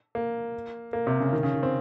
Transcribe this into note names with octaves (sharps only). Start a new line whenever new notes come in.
A#3
A#3
C3
C#3
D#3
C#3
D#3
C4